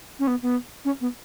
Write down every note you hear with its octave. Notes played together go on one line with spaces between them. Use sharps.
C#4
B3
B3
C#4
B3